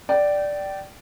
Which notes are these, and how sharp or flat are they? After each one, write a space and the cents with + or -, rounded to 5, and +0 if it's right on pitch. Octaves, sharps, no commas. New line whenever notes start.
D5 +0 G5 -25